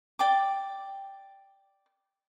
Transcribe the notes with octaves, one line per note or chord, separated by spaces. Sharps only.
D5 G5 D6